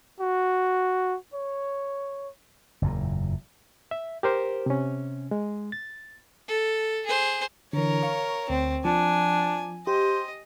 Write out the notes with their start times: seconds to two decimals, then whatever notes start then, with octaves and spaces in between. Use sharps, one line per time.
0.21 F#4
1.34 C#5
2.82 F#1 E2 A#2
3.91 E5
4.23 G4 A#4 C5
4.66 C3 C#4
5.31 G#3
5.72 A6
6.48 A4
7.06 G#4 C5
7.73 D3 E3 A#4 C#5
8.02 F5 C#6
8.50 D2 C4
8.85 F3 D4 G#5
9.87 G4 C5 D#5